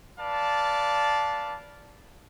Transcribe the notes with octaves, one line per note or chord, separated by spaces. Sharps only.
B4 D5 F5 A5